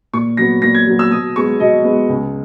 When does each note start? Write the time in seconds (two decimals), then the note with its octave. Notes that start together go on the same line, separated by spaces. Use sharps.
0.13 A#2 C#6
0.37 F#3 B3 A#6
0.62 A#2 A#6
0.74 G#6
0.87 F#3 B3
0.99 E6
1.11 B2 D#6
1.36 G#3 B3 C#6
1.60 B2 D#5
1.85 G#3 B3
2.09 C#2